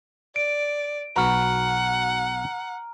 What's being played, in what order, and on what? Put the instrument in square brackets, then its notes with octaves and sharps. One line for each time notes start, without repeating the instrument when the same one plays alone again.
[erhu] D5 [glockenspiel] D7
[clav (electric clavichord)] B1 F#4 B4 [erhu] F#5 [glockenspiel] A#5 F6